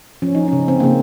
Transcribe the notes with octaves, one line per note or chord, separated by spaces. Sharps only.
F3 C#4
D#4
C#3 C#4
C4
C#3 A#3